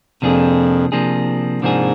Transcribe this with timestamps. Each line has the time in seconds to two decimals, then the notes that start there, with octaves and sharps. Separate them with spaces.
0.22 F2 C3 F3 A#3 D4 G#4
0.92 C3 F3 A#3 D4 G#4
1.62 G#2 C3 F3 A#3 D4 G#4